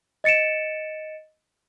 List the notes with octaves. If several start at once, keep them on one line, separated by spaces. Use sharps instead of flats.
D#5 A6 C#7 D7 E7